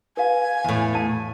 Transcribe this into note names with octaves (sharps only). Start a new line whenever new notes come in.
B4 F5 G#5
E2 A2
A5